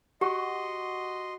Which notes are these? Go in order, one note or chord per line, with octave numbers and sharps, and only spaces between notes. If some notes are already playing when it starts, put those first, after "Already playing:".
F#4 G4 D#5 C6